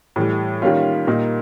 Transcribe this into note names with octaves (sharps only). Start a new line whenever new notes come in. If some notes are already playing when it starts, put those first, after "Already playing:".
A2 E3 G3
D#3 G3 A#3 C#4 F4
A#2 G3 A#3 D#4